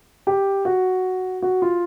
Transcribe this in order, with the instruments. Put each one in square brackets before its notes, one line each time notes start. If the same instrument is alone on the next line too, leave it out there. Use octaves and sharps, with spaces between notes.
[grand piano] G4
F#4
F#4
F4